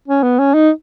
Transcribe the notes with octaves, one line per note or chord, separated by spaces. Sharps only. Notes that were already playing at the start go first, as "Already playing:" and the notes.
C#4
B3
C#4
D#4